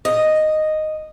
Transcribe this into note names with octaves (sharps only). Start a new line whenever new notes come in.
D#5